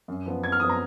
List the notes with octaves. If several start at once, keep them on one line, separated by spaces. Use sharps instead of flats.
F#2
F3 B3
F#2 G#6
F6
F3 B3 D#6
A#5